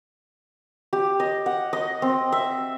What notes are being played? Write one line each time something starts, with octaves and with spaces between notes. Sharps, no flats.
G4
D#5
F#5
D#5
C4
E5